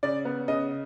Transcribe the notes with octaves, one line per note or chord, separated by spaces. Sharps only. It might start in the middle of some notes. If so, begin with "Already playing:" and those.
C#3 D5
B3
C#3 D#5